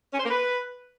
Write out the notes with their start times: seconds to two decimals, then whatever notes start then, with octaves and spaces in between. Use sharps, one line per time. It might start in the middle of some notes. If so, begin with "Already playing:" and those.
0.13 C#4
0.19 C5
0.24 A#3
0.30 B4